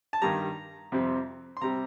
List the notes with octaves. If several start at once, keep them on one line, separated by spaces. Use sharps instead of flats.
A5
G2 D#3 G3 A#5
F2 C3 G3 C4
C6
C3 G3 C4 A#5